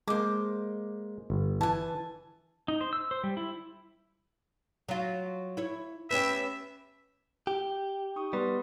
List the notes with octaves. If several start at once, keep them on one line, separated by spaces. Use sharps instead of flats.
G#3 A#3 C5 D6
G1
E3 G#5 A5
D#4
C5
E6
C5
G3
E4
F#3 F4
E4 C#5
B3 C#4 G4 E5
G4
D#4 C#6 D#6
G3 B3 B4 C6